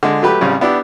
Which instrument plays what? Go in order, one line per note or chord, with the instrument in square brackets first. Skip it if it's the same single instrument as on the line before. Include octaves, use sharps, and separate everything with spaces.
[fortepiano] D3 G#3
F#3 A3 G4 B4
A1 C#3 G3 C4 C#4
B3 D4 E4 G4